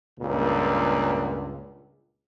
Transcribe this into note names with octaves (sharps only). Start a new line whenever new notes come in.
C#2 G2 A#2